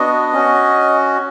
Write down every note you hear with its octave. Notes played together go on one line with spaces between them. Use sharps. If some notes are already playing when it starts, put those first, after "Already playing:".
Already playing: B3 D4 F#4 D#5
C#4 F#4